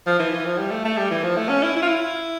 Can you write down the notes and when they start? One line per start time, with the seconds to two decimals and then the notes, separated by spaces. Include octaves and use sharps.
0.06 F3
0.19 E3
0.32 E3
0.45 F3
0.58 G3
0.71 A3
0.85 A3
0.97 G3
1.11 E3
1.23 F3
1.37 A3
1.49 C#4
1.63 E4
1.76 E4
1.82 F4
1.88 E4